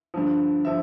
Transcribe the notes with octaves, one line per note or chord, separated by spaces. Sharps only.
G2 D3 F3
D3 F3 E5